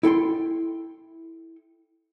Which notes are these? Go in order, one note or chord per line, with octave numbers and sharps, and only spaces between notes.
E4 A4 G5 C6